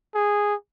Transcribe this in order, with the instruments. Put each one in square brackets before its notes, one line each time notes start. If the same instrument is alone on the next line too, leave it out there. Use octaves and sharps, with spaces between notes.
[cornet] G#4